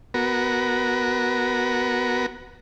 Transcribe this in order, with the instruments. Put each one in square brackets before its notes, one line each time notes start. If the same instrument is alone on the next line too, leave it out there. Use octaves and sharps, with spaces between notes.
[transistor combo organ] B3 F#4 A#4